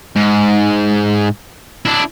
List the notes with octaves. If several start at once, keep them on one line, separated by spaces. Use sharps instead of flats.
G#2
D4 E4